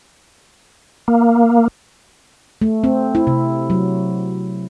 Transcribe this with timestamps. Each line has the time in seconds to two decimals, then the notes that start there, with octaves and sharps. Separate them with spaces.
1.08 A#3
2.62 A3
2.84 C4
3.15 E4
3.27 C3
3.70 F#3